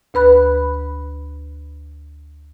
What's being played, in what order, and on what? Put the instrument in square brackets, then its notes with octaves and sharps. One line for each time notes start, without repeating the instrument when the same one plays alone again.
[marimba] D2 B4 B5 F#6